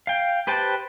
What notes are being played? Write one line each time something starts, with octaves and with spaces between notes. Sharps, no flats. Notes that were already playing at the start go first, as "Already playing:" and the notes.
F5 G5
G4 B4 C5 G5 A5